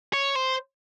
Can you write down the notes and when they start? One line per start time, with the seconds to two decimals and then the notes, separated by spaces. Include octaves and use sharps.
0.13 C#5
0.35 C5